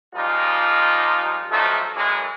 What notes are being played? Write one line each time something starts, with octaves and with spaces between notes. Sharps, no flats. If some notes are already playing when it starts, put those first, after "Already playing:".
A#2 F3 G3 G#3 D#4 F4
A1 F3 F#3 A3 D#4 A4
F#2 E3 G#3